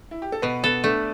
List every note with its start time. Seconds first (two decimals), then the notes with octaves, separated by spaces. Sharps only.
0.11 E4
0.22 G4
0.32 A4
0.42 B2 B3 B4
0.63 B3 A4 B4
0.84 A3 D4 D5